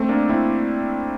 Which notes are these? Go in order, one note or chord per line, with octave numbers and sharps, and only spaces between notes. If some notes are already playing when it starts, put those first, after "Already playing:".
Already playing: A3 C4
A#3 D4
C4 E4